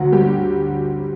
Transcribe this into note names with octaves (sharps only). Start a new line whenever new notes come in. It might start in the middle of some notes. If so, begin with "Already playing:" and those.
Already playing: D2 D3 F#3 F#4
G3 G4